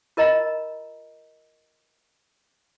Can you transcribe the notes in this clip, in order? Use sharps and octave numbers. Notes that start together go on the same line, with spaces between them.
F4 A#4 D#5 A#5